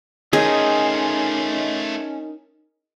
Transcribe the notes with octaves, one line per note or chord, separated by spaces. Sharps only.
A3 C#4 D#4 F4 G#4 A#4 D#5